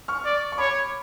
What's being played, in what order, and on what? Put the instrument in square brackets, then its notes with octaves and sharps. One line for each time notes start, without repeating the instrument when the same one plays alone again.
[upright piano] C#6 F6
[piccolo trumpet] D5
[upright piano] C#6
[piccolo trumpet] C#5 [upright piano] B5 D6